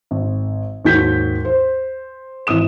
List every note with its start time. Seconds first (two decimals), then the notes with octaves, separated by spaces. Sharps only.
0.11 G#1
0.85 D#2 G#2 F#4 G6 B6
1.45 C5
2.47 G#1 E3 D#6 E7